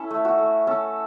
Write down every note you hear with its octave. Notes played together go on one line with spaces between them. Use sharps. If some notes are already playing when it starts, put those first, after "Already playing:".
Already playing: C#4 E4 A4 E5
A3
F#4
A3
C#4 A4